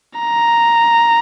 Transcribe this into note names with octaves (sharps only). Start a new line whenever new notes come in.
A#5